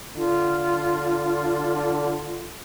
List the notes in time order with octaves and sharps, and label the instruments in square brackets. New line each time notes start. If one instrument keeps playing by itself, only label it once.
[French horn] D3 [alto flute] F4